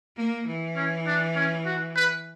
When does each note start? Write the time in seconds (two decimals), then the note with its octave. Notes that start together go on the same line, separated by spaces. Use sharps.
0.17 A#3
0.46 E3
0.76 C#4
1.07 D4
1.36 C#4
1.66 F#4
1.96 B4